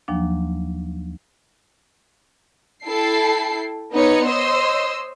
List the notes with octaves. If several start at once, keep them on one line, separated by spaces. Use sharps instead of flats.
D#2 F3 F#3 A#3 D4
E4 A4 G5 C7
B3 D#4 B4 C#5 D#5 C#7
C5 C#5 D#5 C6 E6